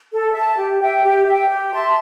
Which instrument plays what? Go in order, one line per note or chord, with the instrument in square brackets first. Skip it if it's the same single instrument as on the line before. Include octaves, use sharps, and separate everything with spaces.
[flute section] A4
E5 A5
G4
E5 G5
G4
E5 G5
G4
E5 A5 C6